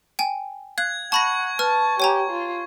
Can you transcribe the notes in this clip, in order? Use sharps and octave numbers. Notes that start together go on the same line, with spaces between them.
G5 G#5
F5 F#6 G#6
F#5 A5 B5 C#6 G#6 A#6
B4 A5 F6
G4 C#5 G#5 A#5
F4